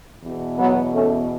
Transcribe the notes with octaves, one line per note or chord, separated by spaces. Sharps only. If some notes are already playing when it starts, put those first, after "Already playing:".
E2 B2
F#3 B3
A3 C#4